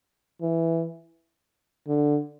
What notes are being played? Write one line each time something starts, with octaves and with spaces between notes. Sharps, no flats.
E3
D3